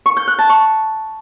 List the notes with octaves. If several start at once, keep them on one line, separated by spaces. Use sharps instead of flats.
C#6
G6
F#6
A5
C#6